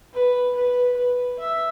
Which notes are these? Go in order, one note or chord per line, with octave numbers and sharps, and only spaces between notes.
B4
B4
B4
E5